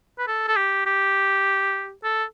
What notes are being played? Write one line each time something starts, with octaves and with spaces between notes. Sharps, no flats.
B4
A4
A4
G4
G4
A4